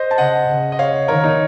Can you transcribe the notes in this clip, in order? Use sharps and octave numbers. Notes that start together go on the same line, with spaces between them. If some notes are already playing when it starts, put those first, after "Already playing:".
Already playing: C5 D#5
A5
C#3 D#5 F#5
C#3
D#5
C#5 F5
D#3 A#4 C#5
D#4